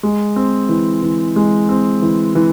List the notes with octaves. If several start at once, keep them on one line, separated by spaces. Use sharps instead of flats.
G#3
C4
E3
E3
G#3
C4
E3
E3